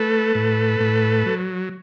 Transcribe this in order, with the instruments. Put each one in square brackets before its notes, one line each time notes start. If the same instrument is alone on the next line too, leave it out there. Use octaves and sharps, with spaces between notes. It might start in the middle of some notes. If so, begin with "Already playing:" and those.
Already playing: [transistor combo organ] A3 A4 B4
A2
A2
F#3